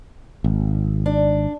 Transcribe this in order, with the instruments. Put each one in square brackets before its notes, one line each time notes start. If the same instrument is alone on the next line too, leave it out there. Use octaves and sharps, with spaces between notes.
[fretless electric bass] G#1
[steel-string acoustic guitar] D4